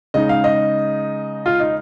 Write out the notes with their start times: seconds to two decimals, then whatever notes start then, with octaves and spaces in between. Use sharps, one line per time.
0.14 C#3 G#3 D#4 D#5
0.29 F5
0.44 D#5
1.46 F4
1.60 D#4